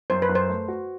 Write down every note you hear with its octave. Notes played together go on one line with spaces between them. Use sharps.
F#2 C5
B4
F#2
C5
A3
F#4